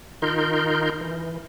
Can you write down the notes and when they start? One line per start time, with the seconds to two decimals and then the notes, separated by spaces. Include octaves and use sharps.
0.22 D#3 D#4 F4 A#4 C6 G6
1.01 E3